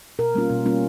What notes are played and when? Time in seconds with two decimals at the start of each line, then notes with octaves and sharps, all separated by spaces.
0.19 B2 A#4
0.35 G3 A#3 C#4 F4
0.50 B2
0.66 G3 A#3 C#4 F4